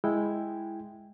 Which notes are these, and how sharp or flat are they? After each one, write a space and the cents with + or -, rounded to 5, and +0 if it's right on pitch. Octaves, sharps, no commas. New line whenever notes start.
G#3 +0 E4 +0 G5 +0